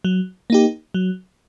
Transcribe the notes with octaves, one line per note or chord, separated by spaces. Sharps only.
F#3
A#3 D#4 G4
F#3